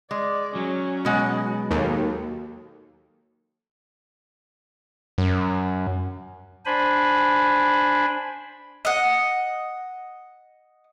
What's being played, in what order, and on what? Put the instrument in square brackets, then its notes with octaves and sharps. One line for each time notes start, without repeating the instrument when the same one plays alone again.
[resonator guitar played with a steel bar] G#3 [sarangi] D5
[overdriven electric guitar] F#3 [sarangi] C#4
[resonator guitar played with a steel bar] B2 G#3 F#5
[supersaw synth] D#2 [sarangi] A4
[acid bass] F#2
[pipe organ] D4 C5 G#5 B5
[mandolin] D#5 F#5